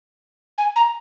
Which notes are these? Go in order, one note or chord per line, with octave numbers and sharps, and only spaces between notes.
G#5
A#5